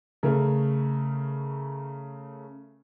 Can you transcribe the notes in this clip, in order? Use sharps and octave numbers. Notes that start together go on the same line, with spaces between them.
C#3 A3 A#4